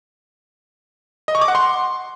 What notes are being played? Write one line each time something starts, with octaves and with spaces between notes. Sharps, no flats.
D#5
C#6
D6
F#5
C6